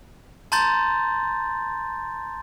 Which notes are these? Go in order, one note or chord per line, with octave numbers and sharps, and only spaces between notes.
A5 A#5 C6 G6 A6